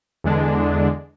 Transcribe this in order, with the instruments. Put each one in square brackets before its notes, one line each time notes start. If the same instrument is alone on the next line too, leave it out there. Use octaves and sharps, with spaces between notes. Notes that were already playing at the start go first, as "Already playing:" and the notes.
[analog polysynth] E2 D3 G#3 D4